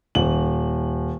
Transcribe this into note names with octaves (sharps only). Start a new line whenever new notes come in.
D#1 F#7